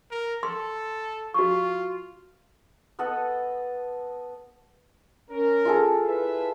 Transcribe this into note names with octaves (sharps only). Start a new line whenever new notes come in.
A#4
A4 C6
F4 F#4 C#6
B3 A4 D#5 F#5
C#4 A#4
F4 G#4 A4
E4 B4 E5